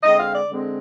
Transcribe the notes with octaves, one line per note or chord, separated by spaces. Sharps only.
D3 G#3 C4 D#5
F5
D5
D3 G#3 C4